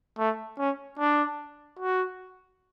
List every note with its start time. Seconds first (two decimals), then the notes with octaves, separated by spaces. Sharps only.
0.18 A3
0.58 C#4
0.99 D4
1.79 F#4